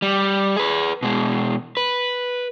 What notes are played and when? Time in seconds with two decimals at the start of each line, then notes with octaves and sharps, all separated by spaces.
0.02 G3
0.57 G#4 B4
1.03 B2 G#3
1.77 B4